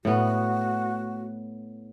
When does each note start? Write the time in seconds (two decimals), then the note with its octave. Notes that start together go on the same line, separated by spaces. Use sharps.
0.05 A2 B3 F#4